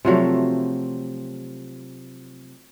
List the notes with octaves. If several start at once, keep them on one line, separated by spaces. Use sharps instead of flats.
C3 F3 F#3 A3